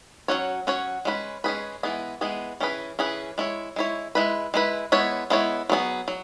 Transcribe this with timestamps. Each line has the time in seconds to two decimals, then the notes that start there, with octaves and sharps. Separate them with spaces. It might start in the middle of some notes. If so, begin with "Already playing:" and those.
0.28 F#3 C#4 F#4 C#5
0.67 F#3 C#4 F#4 C#5
1.05 G#3 C#4 G#4 B4
1.44 G#3 C#4 G#4 B4
1.83 E3 G#3 B3 G#4
2.21 E3 G#3 B3 G#4
2.60 E3 C#4 G#4 B4
2.99 E3 C#4 G#4 B4
3.38 G#3 E4 C#5
3.76 G#3 E4 C#5
4.15 G#3 E4 B4
4.54 G#3 E4 B4
4.92 G#3 B3 E4 C#5
5.30 G#3 B3 E4 C#5
5.69 F#3 B3 G#4
6.08 F#3